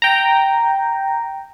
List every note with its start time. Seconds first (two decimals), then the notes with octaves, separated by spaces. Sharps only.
0.02 G5 A#5